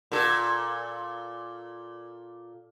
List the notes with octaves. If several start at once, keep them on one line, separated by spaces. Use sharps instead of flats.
A#2 A4